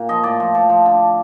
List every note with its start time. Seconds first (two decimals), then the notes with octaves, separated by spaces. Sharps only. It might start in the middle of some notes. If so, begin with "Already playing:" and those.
Already playing: A#2
0.09 F3 D#5
0.23 A2 D5
0.40 F3
0.55 F3
0.70 F3
0.86 D3